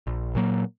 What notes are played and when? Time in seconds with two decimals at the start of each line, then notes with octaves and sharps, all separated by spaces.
0.07 A#1
0.35 A#2 F#3 A#3